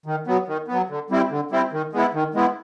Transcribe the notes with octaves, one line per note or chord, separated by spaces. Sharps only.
D#3
F#3 B3
D#3
F#3 B3
D3
G3 C4 E4
D3
G3 C4 E4
D#3
G#3 B3 E4
D#3
G#3 B3 E4